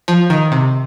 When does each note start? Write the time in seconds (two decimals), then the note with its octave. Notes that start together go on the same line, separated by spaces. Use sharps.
0.08 F3
0.30 D#3
0.52 C3